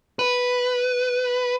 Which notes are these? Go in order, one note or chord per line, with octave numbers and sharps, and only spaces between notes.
B4